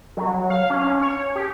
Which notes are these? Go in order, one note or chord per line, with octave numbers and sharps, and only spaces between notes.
F#3
F5
C#4
C#4
C#5
G4